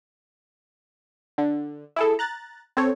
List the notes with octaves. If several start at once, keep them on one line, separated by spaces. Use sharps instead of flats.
D3
E4 G#4 A4
A#5 F#6 A6
C4 A4 C#5